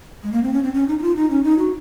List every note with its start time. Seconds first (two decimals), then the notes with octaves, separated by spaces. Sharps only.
0.23 G#3
0.32 A#3
0.43 C4
0.53 C#4
0.64 C4
0.74 C#4
0.88 D#4
0.99 D#4
1.02 F4
1.16 D#4
1.30 C#4
1.44 D#4
1.59 F#4